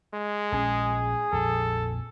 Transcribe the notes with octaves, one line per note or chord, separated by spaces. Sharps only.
G#3
A#1 C#4 G#4
A#1 F2 A4